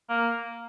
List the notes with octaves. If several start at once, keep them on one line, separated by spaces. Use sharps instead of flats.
A#3